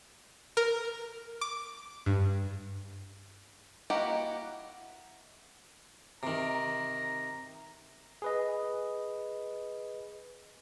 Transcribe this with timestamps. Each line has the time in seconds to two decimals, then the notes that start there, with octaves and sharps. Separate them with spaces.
0.57 A#4
1.41 D6
2.06 G2
3.90 A#3 E4 F#4 G4 D#5 F#5
6.23 C3 D#3 A#5
8.22 G#4 B4 D#5